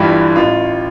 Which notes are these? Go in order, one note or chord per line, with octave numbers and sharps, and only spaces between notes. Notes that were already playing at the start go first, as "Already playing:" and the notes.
Already playing: G1 G2 E3 G3 E4 F4
A1 F4